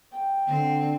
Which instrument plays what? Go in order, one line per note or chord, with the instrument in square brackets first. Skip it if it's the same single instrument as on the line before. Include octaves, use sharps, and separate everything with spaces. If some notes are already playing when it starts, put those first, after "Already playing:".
[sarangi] G5
[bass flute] D3 [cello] C4